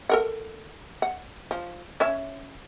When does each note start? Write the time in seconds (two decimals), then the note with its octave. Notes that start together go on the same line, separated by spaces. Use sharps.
0.09 A4 A#4 F#5
1.02 F#5
1.51 F3
2.00 C#4 C#5 E5